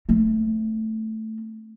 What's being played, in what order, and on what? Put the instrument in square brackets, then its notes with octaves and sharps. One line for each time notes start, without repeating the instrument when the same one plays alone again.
[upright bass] A3 C4